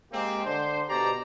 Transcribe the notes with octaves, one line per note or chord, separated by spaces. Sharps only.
G#3 A#3 C4 G4
D3 D4 C5
B2 G4 C5 D5 A#5